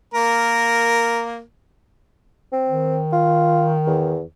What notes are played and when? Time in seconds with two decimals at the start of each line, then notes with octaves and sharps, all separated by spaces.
0.14 A#3 A#4
2.53 C4
2.69 D#3
3.13 F4
3.87 E2